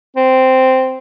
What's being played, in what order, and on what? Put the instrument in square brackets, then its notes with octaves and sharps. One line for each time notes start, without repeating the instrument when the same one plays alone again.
[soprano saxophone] C4